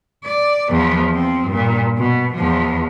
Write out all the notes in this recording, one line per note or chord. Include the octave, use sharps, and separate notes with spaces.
D5
E2 F3
F3 C4
G2 A#2
B2
E2 F3